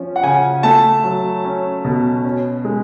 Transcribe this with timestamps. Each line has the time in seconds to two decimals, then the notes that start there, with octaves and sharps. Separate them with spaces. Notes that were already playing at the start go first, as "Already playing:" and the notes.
Already playing: F3 C#4
0.16 F#5
0.23 C#3 G#5
0.63 A3 A5
1.04 F#3
1.45 C#4
1.85 B2
2.24 C#4
2.65 G#3